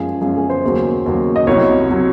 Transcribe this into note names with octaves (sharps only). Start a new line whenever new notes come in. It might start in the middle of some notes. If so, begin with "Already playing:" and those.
Already playing: F#2 F3 G#3 G#4
F#2 F3 G#3
G#4
C5
D#2 C#3 F#3
D#2 C#3 F#3
D#5
C2 C3 F#3 C#5
C3 F#3